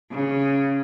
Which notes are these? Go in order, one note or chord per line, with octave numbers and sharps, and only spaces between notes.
C#3